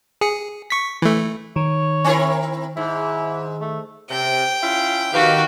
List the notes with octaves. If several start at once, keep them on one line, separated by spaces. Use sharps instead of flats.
G#4 C#7
C#6 B6
E3 A3
D#3 C#5
C4 E4 A#4
G#2 E4
A3
C3 G5
C#4 E4 F4
B2 D#3 F3 F#4 G4 B4 F5